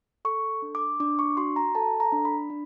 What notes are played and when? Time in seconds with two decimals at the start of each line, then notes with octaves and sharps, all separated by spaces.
0.25 A4 C#6
0.62 D4
0.75 D6
1.00 D4 D6
1.19 C#6
1.37 F#4 C6
1.56 A#5
1.75 A4 A5
2.00 A#5
2.12 D4
2.25 B5
2.50 D4